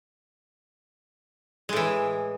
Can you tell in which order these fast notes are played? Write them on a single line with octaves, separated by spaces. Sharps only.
G#3 A2 E3